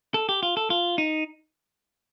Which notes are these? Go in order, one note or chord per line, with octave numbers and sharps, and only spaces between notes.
A4
G4
F4
A4
F4
D#4